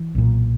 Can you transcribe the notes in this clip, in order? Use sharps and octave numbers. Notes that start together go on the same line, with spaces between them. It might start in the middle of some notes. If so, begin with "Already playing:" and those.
Already playing: E3
B1 A#2